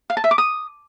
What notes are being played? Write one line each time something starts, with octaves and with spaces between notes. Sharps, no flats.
F5
A5
E5
D6
D#6